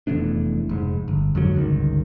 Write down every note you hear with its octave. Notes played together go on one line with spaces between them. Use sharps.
F1 E2 A3 D4
F1 G#2
G1
F2 G#2 D3 F#3
G1 C#2 D#3